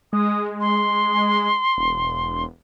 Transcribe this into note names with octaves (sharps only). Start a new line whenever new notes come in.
G#3 D#6
C6
E1